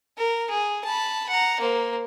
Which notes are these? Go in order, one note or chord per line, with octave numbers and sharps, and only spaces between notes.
A#4
G#4
A5 B5
F#5 A#5
A#3 C5